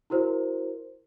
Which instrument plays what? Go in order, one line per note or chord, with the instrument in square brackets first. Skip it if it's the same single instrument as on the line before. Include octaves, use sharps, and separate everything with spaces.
[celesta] E4 F#4 A#4 C5